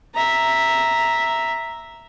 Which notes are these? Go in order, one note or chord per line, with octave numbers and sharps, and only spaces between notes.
E5 A#5